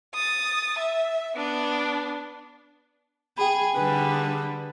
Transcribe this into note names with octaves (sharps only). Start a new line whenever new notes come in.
D#6 A6
E5
B3 D4
G#4 G5 G#5 B5
D3 G3 G#4 B4